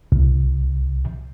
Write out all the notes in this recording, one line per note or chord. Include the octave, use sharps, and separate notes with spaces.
C2